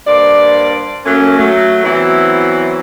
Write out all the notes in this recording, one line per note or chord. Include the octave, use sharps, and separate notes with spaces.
G2 A#3 C5 D5
F#3 A3 A#3 C#4
F#3 A3
E3 F#3 B3 C4 E4